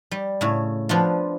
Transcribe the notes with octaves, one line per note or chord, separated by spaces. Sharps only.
G3
A2 C#3
F3 B3 D4 F4